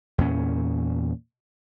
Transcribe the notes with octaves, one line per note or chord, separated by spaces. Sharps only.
E2 A#2 C#4